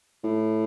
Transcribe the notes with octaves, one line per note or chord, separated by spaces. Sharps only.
A2